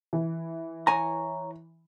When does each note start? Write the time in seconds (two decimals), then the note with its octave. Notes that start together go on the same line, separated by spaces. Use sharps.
0.13 E3
0.87 C#5 G#5 A#5